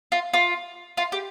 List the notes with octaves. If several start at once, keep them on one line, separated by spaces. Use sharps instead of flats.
F4
F4
F4
G4